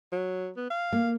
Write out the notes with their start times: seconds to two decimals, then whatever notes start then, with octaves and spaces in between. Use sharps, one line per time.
0.12 F#3
0.57 B3
0.71 F5
0.93 A#3